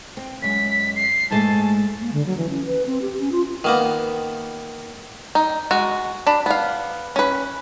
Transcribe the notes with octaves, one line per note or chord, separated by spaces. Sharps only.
C4
F#2 G#3 B6
C7
G#2 G#3 A3 A5
A#3
D3
F#3
E3
C#4
B4
C4
G4
C#4
F4
D#3 A#3 B3
D#4
G#3 F#4
D4 B5
B3 F5
C#4 B4